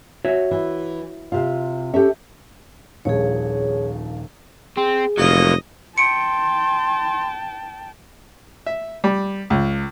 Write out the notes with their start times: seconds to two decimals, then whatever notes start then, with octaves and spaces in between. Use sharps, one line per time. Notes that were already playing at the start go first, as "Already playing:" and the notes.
0.25 F#4 C#5 E5
0.51 E3
1.32 C3 F4
1.94 C#4 G4 A4 E5
3.05 D#1 A#1 D#2 G#4 C#5
4.77 C4 G#4
5.18 F1 F#3 A#3 D#5
5.98 G5 A5 C6 C#7 D7
8.66 E5
9.04 G3
9.50 C#2